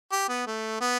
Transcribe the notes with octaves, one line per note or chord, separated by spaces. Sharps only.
G4
B3
A3
B3